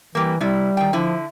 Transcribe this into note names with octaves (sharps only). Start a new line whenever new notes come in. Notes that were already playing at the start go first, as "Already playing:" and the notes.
E3 G3 A#3
C3 G3 E4
D#3 G5
D3 F3 E4